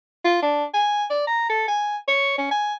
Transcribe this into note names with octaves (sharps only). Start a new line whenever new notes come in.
F4
D4
G#5
D5
A#5
A4
G#5
C#5
C#4
G#5